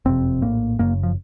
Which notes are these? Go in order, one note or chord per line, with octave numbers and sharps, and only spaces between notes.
F#1 F2 C3 C4
A#1 A2 A#3
F#1 F#2 C#3 A#3
F3